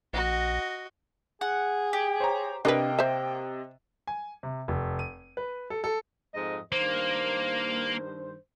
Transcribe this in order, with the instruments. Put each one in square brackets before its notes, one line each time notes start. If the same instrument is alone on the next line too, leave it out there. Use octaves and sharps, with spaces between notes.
[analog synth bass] A#1 [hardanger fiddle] F#4 D#5
[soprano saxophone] G#4 [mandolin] F#5
[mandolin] G4
[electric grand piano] C5 C#5 A#5
[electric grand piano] C3 D#5 [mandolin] A#3 [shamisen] D4 A#4 B4 [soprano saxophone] G5
[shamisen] C5 E5
[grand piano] G#5
C3
F1
D#7
B4
A4
A4
[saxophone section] F2 G#2 D#5
[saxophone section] G2 D#3 C5 [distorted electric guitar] A#3